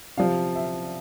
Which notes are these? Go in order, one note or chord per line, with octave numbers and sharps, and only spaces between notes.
C3 F3 F5
E5